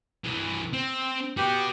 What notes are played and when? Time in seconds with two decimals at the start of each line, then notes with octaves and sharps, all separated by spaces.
0.24 C2 E3
0.73 C4
1.37 F#4 G4 B4